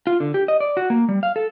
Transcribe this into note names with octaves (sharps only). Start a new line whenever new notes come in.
F4
D3
G4
D#5
D5
F#4
A#3
G3
F5
A4